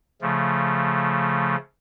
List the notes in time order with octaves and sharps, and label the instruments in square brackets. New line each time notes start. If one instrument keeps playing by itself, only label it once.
[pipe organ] C#3 F3 A3